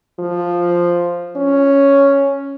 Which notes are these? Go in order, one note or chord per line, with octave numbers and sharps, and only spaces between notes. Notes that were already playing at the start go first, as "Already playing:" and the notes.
F3
C#4